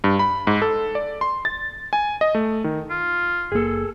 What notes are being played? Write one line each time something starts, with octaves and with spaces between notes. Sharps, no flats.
G2
B5
G#2
A4
D5
C6
A6
G#5
D#5
A3
D#3
F4
F#1 A#3 G#4 A4